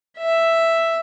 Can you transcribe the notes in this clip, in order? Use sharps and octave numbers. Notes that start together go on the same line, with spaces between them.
E5